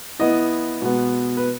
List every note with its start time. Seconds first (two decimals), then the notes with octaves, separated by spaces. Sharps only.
0.19 E3 B3 E4 D#5
0.82 B2 G#3 B3
1.37 B4